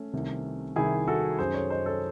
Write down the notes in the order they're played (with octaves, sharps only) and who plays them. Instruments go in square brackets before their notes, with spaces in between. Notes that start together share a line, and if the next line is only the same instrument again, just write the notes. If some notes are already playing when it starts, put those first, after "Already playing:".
Already playing: [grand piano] A3 C#4
C2 C3 D#3
C2 C3 D#3 E4 G#4
F#4 A4
F#2 D#3 G#4 C5
A4 C#5
C5 D#5
A4 C#5